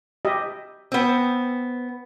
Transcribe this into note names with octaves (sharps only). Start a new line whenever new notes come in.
G4 D#5 E5
B3 C4